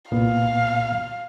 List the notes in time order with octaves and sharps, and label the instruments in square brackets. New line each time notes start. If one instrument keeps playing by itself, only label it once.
[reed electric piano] C2 A#2 B3 [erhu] F5